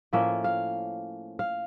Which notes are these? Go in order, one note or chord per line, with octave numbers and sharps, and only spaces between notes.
A2 F3 A#3 C#4 E5
F5
F5